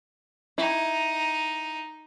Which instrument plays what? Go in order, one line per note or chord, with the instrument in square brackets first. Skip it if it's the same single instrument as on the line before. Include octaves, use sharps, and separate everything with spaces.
[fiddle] D#4 [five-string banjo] E4